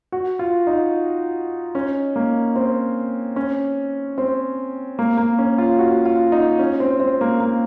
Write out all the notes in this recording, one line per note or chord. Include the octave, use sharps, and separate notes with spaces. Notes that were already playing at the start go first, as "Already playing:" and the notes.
F#4
F4
D#4
C#4
A#3
C4
C#4
C4
A#3
A#3
C#4
F4
F#4
F4
D#4
C#4
C4
C4
A#3
A#3